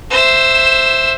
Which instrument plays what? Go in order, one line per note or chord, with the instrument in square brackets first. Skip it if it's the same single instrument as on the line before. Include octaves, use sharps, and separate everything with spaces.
[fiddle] C5 E5